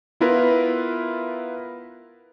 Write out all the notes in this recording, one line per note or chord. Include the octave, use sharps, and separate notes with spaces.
B3 E4 F4 A#4 B4